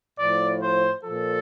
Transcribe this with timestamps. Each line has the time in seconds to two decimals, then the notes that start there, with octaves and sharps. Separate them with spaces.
0.18 A2 F3 D5
0.61 C5
1.04 A#2 F3 A4